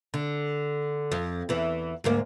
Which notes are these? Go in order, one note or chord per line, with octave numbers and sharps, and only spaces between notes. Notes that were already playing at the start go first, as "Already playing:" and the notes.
D3
F2
E2 E3
D2 G#2 A#3